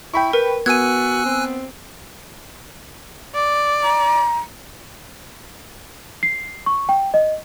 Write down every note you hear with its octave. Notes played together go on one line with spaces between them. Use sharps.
E4 G5 B5 C#6
A#4 B4
B3 F#4 G#5 E6 F#6 G#6 D#7
C4
D5
A#5
C7
C#6
G5
D#5